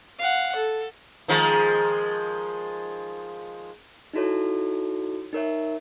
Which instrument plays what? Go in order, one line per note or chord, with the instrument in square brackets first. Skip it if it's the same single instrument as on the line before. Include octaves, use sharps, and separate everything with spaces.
[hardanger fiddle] F5 F#5
A4
[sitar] D#3 F3 G#3
[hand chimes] D#4 E4 F#4 A4 C#5
D#4 A#4 C#5 E5